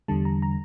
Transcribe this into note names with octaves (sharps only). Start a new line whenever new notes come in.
E2 D3 G3 A5
A#5
A#5